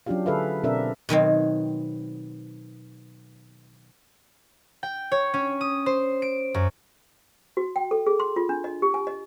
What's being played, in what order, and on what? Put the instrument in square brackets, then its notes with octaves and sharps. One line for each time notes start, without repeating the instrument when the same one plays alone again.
[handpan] F#3 C#4 D4 F4 G4 F5
D3 G#4 A4 B4 E5 F5
B2 C4 D4 A4 A#4 E5
[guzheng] B2 D#3 F#3 C4
[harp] G5
C#5
C#4
D#6
C5
D7
F#2
[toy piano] F#4
G5
A4
G#4
C6
F4
D4
D#5
G4
G#5
D#5